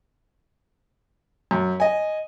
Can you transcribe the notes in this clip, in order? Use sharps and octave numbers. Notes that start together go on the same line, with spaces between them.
F#2
D#5 G#5